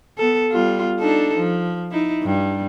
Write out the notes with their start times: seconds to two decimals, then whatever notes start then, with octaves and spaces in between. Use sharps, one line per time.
0.18 B3 A4
0.51 G3 B3 F4
1.00 D4 D#4 A4
1.38 F3
1.91 D#4 E4
2.23 G2 G3